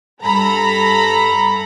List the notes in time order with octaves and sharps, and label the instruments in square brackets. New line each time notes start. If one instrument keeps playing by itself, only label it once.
[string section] G2 A4 A#5 B5